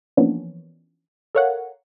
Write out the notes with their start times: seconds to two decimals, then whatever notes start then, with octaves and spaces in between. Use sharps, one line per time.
0.17 E3 F3 A#3 B3 C#4 D4
1.35 A4 A#4 C#5 F5 F#5